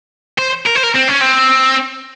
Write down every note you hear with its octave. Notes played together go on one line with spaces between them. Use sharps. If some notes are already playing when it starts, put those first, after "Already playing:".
C5
A#4
C5
A#4
C4
C#4
C4